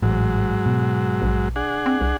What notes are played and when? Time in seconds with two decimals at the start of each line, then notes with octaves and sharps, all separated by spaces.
0.02 A1 G#2 F#3
0.66 B2
1.22 A#1
1.56 D4 G#4 F#5
1.86 C4
2.01 C2